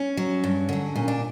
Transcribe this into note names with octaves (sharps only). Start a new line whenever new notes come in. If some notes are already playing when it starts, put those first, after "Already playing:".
Already playing: C#4
F#3
G2
D3 F#3
A#2 C#4
D4